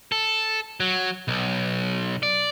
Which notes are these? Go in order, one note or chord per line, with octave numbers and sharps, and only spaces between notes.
A4
F#3
B1
D5